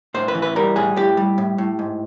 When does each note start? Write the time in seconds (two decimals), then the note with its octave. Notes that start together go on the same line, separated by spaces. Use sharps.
0.14 A2 C5
0.28 B4
0.35 E3
0.42 B4
0.56 G3 A#4
0.76 A2 G#4
0.96 A2 G4
1.17 G3
1.38 A2
1.58 A2
1.79 G#2